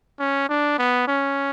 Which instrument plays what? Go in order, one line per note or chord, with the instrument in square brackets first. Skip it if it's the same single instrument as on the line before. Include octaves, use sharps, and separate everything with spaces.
[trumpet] C#4
D4
B3
C#4